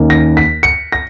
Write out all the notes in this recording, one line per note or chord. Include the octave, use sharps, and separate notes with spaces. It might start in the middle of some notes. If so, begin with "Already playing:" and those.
Already playing: D#2 D#3 A#3 C#4
A#6
B6
C#7
A#6